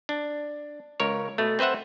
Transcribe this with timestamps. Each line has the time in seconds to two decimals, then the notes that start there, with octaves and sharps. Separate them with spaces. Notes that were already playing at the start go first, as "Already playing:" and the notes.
0.09 D4
1.00 C#2 A#4 C#5
1.38 B2 A3
1.59 C4 B4 C5 E5 F#5